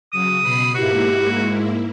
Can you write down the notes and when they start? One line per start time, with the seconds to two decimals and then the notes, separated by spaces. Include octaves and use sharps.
0.13 C#3 F#3 D#6
0.42 B2 B5 C7
0.75 G#2 A#3 E4 F#4 G4
1.34 G#3